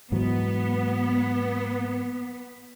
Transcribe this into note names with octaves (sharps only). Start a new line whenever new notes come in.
G#2 E3 F#3 B3